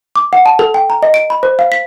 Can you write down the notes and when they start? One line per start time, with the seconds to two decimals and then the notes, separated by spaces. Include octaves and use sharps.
0.16 D6
0.33 F#5
0.46 A5
0.59 A4
0.74 G5
0.90 A#5
1.03 D#5
1.14 D7
1.30 B5
1.43 C5
1.59 F5
1.72 B6